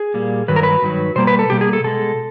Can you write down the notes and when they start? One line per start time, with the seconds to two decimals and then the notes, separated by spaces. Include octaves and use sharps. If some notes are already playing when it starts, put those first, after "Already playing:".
Already playing: G#4
0.14 A#2 G3 A#3
0.48 G2 D#3 F#3 B4
0.56 A#4
0.63 B4
0.82 G2 D#3 F#3
1.16 B2 G3 A#3 C5
1.27 B4
1.39 A4
1.50 B2 G3 A#3 G4
1.61 G#4
1.73 A4
1.84 B2 G#3 A4